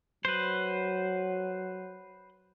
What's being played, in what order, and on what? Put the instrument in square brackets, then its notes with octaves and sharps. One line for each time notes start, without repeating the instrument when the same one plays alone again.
[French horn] F#3 [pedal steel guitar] B4 C5